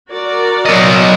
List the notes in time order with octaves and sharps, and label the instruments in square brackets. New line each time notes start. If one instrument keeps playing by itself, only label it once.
[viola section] F#4 A#4 D5
[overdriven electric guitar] F#3 D#5